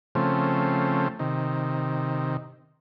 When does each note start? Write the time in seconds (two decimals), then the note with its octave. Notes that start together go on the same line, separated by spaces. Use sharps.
0.15 C#3 F3 A3 C4
1.19 C3 D#3